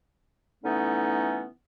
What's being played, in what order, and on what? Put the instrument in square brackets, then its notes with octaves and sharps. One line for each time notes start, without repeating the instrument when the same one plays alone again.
[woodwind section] D3 E3 A3 B3 C#4 D#4